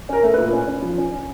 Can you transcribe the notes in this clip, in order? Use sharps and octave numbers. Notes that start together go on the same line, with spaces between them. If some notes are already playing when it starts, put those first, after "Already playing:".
C#4 A#4
A3
A#2 B4
C#4
C#4
F3
C#4
C#4